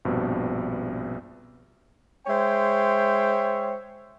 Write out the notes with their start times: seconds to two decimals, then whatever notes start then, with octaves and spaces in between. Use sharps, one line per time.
0.05 A#1 G2 B2 C4
2.27 G#3 C5 C#5 E5 G5